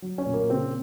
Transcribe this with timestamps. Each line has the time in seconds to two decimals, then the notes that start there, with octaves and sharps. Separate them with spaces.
0.02 F#3
0.18 C#4
0.26 A#2
0.34 A#3
0.49 C#3 C4